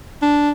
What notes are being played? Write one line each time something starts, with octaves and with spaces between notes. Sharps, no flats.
D4